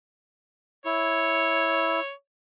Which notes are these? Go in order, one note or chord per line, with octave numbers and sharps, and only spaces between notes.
E4 C#5